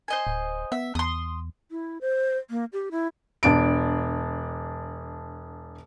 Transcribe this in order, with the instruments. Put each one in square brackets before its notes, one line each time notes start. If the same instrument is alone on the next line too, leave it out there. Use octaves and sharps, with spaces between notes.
[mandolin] C5 D#5 G#5
[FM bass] D1
[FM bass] B3 [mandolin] E5
[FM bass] E2 [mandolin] C6 D#6
[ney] E4
C5
A#3
G4
E4
[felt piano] E1 D4 D7